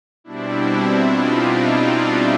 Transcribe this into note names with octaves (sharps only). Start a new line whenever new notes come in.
B2 G3 C4 D4 E4
D#4 F4
D#4 F4
D4